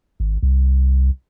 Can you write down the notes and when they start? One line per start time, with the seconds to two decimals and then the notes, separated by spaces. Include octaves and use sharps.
0.20 G#1
0.43 C2